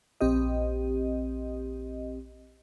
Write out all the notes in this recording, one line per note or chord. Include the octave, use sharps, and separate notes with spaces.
A#1 C4 G4 D#5